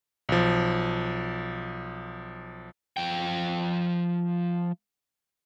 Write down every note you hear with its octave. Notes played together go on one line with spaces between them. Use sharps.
B1 F3
F3 G5